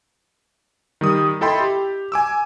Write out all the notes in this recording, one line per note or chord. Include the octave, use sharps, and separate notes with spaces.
D#3 G3 D#6
E4 A4 D#5 G5 B5 C6
G4
G#5 D6 E6